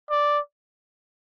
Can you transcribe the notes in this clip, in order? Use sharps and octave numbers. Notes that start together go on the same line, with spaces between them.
D5